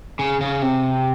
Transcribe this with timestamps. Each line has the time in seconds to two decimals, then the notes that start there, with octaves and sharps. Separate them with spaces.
0.19 C#3
0.41 C#3
0.62 C3